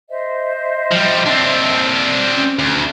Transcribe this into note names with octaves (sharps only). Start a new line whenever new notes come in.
C5 D#5 E5
F3 G3
C4 D4
C#4
D2